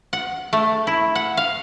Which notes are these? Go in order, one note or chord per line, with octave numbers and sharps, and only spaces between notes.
F#5
A3
E4
F#5
F5